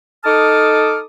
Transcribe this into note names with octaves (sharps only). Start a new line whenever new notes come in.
D#4 A4 A5 D6 D#6 F6